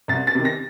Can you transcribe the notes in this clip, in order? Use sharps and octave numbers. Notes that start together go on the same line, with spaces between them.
C2 A6
A6
C3 D#3
A#6